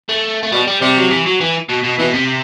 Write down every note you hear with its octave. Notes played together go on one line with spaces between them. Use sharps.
A3
A3
B2 G3
G3
C3 G3
F#3
E3
F#3
E3
B2
B2
B2 E3
C3